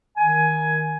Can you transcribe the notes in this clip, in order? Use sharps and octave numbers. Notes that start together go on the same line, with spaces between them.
D#3 G#5